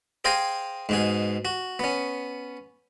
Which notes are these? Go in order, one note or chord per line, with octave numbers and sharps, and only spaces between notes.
G#4 C5 F5 G5 G#5 A#5
G#2 B2 G#4
F#4
B3 C#4